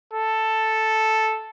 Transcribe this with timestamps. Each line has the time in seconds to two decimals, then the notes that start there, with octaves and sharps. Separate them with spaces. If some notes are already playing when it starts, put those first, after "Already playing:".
0.13 A4